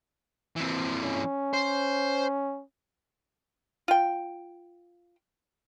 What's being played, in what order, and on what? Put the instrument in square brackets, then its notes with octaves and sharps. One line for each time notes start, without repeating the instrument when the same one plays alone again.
[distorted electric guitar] E3 C4
[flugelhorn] C#4
[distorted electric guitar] C5
[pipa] F4 G5